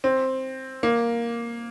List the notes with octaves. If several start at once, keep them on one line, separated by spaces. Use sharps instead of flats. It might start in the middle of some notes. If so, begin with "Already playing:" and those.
C4
A#3